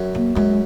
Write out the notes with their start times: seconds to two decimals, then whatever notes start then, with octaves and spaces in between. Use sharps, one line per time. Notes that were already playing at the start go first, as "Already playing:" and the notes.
Already playing: F#2
0.15 A#3
0.36 F#2 G#3